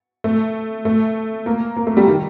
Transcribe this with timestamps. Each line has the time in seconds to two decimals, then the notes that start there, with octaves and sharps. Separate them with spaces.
0.24 A3
0.85 A3
1.46 A#3
1.76 A#3
1.87 A3
1.97 G3
2.07 D#3